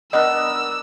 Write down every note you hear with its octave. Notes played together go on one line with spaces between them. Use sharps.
B3 D4 A#4 D#5 E6